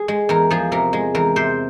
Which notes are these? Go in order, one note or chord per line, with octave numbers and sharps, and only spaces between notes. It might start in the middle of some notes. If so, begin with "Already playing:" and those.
Already playing: G#4
G#3
E2 A#4
F3 G#4
C3 A#4
G#3
E2 A#4
C3 C5